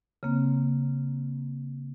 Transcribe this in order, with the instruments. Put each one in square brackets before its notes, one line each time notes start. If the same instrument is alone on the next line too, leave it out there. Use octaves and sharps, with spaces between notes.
[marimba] C#3 A#3 C4